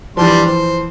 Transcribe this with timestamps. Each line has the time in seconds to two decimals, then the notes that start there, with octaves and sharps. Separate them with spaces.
0.17 E3 F3 G3 D4 C6
0.46 C5